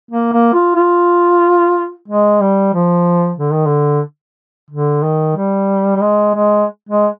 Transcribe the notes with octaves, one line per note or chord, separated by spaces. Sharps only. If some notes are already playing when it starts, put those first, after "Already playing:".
A#3
A#3
F4
F4
G#3
G3
F3
D3
D#3
D3
D3
D#3
G3
G3
G#3
G#3
G#3